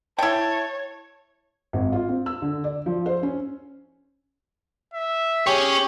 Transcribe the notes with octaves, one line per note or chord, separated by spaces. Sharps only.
E4 C#5 G5 A5
G#1
F4
C4
E6
D3
D5
F3
C5
C#4
E5
C#4 G4 G#4 C#5